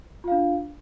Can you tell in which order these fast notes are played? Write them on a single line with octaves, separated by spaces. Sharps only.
F4 F5 D4